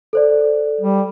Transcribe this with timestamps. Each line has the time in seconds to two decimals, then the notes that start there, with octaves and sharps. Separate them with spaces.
0.13 A4 C5 D5
0.81 G3